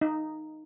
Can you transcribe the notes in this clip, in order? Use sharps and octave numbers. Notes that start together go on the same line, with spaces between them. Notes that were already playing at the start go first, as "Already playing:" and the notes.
D#4